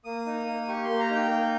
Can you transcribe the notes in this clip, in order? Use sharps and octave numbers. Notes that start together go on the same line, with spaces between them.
A#3 D#6
D#4
A#3
G4 C#6
A#3 C6
A#5
D#4 G5
A#3